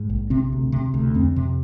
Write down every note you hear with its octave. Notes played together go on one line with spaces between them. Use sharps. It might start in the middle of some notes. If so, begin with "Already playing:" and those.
Already playing: G#2
A#1
C3 C4
D2
C3
D2
F2 C4
C3